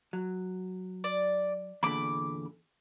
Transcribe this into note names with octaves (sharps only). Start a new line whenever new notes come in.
F#3
D5
E2 A#2 D3 B5 D6